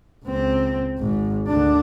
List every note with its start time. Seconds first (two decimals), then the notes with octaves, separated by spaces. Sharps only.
0.25 C#2 C4
0.98 G#1 G#2
1.48 D2 D4